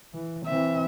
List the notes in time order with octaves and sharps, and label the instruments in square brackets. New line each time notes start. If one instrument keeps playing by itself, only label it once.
[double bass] E3
[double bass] E3 C4 [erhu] E5